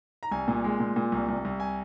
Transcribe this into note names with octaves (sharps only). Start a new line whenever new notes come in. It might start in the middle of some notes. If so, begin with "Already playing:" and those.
A#5
C2 G#5
A#2
G#3
A#2
A#2
C2
C2
C2
G#5